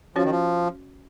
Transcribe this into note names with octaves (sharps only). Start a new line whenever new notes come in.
F3 C#4 F#4 C#5
D#3
F3